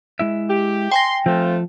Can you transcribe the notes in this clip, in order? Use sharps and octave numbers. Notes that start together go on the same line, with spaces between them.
G#3 E4 E5
G4
G5 G#5 C6 A#6
F3 A3 C4 F4